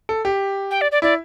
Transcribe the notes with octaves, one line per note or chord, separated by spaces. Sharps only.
A4
G4
G5
D5
D5
E4 D5